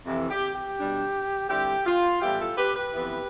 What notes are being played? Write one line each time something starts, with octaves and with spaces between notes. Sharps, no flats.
F2 C3 E3
G4
G4
B2 G3 D4
D3 G3 C4 E4 G4
F4
A2 E3 G3 B3 E4 G4
F4 A4
G4 B4
G4 B4
F2 E3 B3 E4